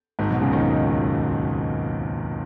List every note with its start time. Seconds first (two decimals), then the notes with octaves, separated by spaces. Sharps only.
0.19 G#1 G#2
0.30 B1 B2
0.41 C#2 C#3
0.52 D#2 D#3